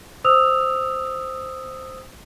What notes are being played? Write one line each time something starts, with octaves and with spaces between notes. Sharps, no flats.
C5 D#6 E6 F7